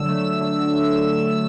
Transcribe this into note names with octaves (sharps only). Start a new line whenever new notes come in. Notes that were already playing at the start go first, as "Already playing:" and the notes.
Already playing: D3 F#3 E6
A3
D3